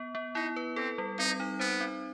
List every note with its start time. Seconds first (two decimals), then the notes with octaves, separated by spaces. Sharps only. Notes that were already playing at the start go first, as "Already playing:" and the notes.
Already playing: B3
0.15 B3
0.35 D#4 E4
0.56 B4
0.76 C4 A4
0.98 G3
1.19 C4 D#4
1.40 D#4
1.60 B3 C5
1.80 C4